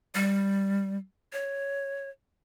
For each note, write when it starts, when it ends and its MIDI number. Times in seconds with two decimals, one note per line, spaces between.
0.15 0.97 55
1.33 2.09 73